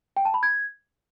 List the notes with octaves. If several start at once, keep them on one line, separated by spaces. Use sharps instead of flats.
G5
A5
B5
G#6